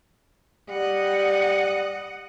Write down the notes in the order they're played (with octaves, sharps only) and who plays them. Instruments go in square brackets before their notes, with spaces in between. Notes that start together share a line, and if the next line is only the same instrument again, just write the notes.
[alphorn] G3 [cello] D#5 F#5